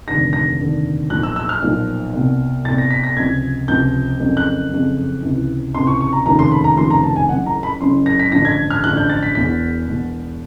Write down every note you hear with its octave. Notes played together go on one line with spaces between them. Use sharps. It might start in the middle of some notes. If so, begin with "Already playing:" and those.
F1 D#2 D3 A#6
A#6
F1 D#2 D3
B1 A#2 F3 F#6
E6
E6
F6
B1 A#2 F3
C2 B2
C2 B2 A6
A#6
B6
A#6
C#2 C3 F3 G#6
C#2 C3 F3 G6
F#1 F2 C#3
F#6
F#1 F2 C#3
C#2 C3 E3
C#2 C3 E3 C6
C#6
C#6
A#5
F1 D#2 C#3 F3 A#5
C6
B5
A#5
F1 D#2 C#3 F3 C6
A#5
A5
G#5
F#1 F#2 C#3 E3 F#5
A#5
B5
F#1 F#2 C#3 E3 C6
A#6
B6
A1 G2 D3 F3 A#6
G#6
F6
A1 G2 D3 F3 F#6
G6
A6
B6
E1 E2 B2 B6
E1 E2 B2